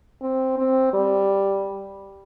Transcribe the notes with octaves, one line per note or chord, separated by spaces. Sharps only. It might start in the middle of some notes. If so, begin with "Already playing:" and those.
C4
C4
G3